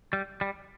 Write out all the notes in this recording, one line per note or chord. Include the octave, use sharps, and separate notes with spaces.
G3
G3